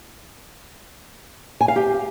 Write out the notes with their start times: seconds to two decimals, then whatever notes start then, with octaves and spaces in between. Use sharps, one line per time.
1.61 G#5
1.68 F5
1.76 G4